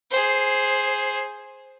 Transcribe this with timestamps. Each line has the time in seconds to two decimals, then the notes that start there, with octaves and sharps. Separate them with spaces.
0.11 G#4 C5